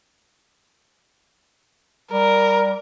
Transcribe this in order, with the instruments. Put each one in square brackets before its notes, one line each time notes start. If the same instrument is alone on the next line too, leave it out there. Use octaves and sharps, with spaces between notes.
[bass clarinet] G3 [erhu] A#4